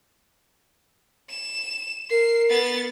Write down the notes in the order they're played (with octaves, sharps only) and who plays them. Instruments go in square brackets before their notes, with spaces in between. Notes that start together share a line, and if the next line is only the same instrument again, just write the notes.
[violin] E7
[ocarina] A#4 [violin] C7
[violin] B3 A6